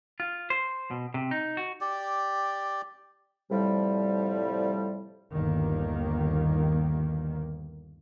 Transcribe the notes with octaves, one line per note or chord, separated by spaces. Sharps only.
F4
C5
B2
C3
D#4
F#4
G4 D5
A2 C3 F3 G3
G1 D#2 D#3 A#3